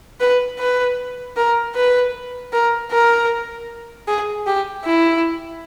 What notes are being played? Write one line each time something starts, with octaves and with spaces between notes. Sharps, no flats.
B4
B4
A#4
B4
A#4
A#4
G#4
G4
E4